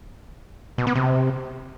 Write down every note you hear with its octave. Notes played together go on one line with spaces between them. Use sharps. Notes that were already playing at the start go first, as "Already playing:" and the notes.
B2
B3
C3